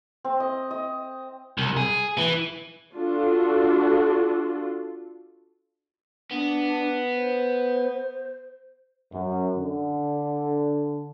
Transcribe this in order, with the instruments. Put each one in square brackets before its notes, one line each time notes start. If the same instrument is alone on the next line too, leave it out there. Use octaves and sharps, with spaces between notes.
[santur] C4
D#5
D#5
[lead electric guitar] C2
G#4
E3
[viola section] D4 F4 F#4 A4
[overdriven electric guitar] B3 [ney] D4
[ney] C5
[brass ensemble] F#2
D3